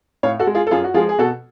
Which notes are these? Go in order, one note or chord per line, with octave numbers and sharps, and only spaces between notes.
A2 C#5 F5
F#4 A4
G#3
F4 G#4
A4
F#2 F4 G#4
F#4
F3 G#3 F4 G#4
G#4
B2 F#4 A4